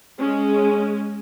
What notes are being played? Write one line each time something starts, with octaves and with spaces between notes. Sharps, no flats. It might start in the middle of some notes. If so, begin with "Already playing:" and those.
G#3 C#4